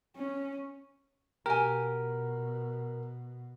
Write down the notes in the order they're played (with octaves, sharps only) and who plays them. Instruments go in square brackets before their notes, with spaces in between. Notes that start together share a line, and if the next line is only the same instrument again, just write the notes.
[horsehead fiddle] C#4
[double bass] B2 [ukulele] G4 G#5 [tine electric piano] A#4